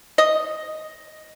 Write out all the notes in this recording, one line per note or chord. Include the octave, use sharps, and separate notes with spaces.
D#5